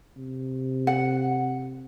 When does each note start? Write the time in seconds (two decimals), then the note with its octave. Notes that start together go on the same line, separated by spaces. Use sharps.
0.17 C3
0.87 F#5